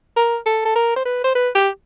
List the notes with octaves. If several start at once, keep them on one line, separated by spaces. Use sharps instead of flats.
A#4
A4
A4
A#4
C5
B4
C5
B4
G4